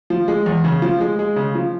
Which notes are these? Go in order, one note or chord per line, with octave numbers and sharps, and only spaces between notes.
F3
G#3
E2
C#3
F3
G#3
G#3
C#3
F3